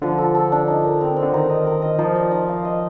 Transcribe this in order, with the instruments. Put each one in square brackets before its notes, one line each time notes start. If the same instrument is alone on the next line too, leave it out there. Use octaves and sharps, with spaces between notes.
[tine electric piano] D3 [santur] F3
[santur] A4
A4
D4
D#4
A#4
C4
C4
[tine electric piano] D3
[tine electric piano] D#3 [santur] A#4
[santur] D#5
A#4
D#5
[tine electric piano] F3 [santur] D#4
[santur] D5
D#4
F5
D#5